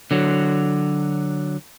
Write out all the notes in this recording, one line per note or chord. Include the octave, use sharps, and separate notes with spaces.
D3 F#3